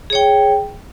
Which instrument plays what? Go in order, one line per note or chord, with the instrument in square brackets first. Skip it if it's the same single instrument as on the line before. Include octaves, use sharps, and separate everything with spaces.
[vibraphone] G#4
C#5
G5